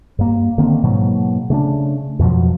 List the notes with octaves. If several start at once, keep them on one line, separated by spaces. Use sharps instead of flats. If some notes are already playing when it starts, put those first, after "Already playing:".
G2 A#3
D3 D#3 A#3 C4
G#2 B2 F#3 A#3
C#3 A3 C#4 D4
F2 B2 F3 F#3